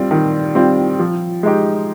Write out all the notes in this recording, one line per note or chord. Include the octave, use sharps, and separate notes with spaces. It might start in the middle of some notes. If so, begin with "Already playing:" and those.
Already playing: G3 C4 F4
D#3
G3 C4 F4
F3
G#3 D#4 G4